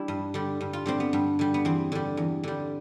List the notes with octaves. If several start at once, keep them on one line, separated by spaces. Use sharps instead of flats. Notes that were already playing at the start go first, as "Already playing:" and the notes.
Already playing: G3 D4 E4
G2
D3 G3
G2
F4
D3 G3 C4
B3
G2
D3 G3
B3
E2 C4
D3 G3
E2
D3 G3